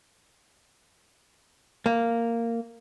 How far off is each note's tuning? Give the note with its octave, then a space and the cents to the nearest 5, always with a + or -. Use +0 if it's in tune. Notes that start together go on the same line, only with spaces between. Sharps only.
A#3 -10